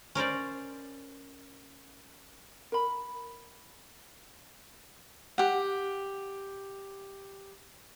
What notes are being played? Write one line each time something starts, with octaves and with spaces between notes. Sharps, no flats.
C#4 A#4 C5 D5
A#4 B5
G4 F#5